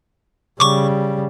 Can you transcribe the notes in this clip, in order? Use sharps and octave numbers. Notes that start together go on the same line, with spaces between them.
C#3 G3 C#6 D6